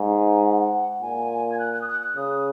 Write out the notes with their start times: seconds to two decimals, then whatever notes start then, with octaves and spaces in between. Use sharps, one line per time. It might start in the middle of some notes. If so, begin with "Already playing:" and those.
Already playing: G#2
0.15 G#5
0.43 F#5
1.01 A#2 G#5
1.52 G#6
1.59 F#6
1.73 F#6
1.81 D#6
1.88 F#6
2.02 F#6
2.16 C#3 D#6